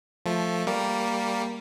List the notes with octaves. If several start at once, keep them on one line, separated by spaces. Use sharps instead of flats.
F3 A3
G3 A#3